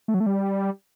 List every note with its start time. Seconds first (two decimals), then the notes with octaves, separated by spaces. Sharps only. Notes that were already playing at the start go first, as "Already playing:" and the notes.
0.08 A3
0.14 F#3
0.20 A3
0.26 G3